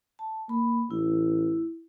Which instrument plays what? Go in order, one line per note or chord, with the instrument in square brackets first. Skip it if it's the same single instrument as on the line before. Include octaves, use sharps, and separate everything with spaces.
[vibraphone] A5
[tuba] A#3 [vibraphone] B5
[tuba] A1 [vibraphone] E4